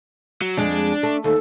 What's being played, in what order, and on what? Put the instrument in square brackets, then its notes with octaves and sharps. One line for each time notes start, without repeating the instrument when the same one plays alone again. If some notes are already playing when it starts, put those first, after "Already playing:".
[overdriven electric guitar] F#3
[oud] F2 G#3 [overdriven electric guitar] D4
[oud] A3
[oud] D#2 [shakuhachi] A4